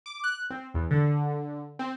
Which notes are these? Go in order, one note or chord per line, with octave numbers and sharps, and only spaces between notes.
D6
F#6
C4
E2
D3
C4